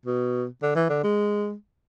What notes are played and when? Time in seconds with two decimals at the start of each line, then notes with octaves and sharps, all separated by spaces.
0.06 B2
0.62 D3
0.75 E3
0.89 D3
1.04 G#3